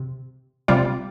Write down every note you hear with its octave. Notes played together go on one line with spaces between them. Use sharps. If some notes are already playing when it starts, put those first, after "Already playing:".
Already playing: C3
C3 G3 F4 D5